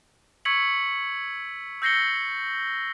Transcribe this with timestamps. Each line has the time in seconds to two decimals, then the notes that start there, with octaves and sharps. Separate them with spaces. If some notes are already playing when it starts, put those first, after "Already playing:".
0.45 C#6 E6 G#6 B6 C#7 F#7
1.82 E6 G6 A#6 C7 C#7 G7